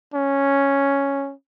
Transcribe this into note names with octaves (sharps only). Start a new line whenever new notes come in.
C#4